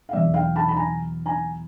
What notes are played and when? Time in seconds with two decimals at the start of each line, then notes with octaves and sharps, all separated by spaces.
0.09 F5
0.13 E2 B2 F#3 D5 E5
0.34 F5 G5
0.56 A5 B5
0.69 B5
0.76 G#5 A#5
1.26 G#5 A#5